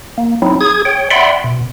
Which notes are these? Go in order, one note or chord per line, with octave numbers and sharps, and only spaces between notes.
A#3
F#3 C4 D#4 E4
G#4 D#6 G#6
C#5 G5
D5 E5 F#5 G5 B5 C6
B2